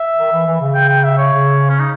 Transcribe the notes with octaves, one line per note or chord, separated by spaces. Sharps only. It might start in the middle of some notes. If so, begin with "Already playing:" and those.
Already playing: E5
D#3
E3
E3
C#3
G5
G5
E5
C#5
C#3
C#4
D#4